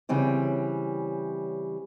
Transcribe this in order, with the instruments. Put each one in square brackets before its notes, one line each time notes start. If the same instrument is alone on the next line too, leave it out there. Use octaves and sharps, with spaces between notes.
[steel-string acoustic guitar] C#3 E3 G3 C4 C#5